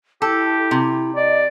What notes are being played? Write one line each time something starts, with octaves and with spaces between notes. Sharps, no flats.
E4 G4 A4
C3
D5 D#5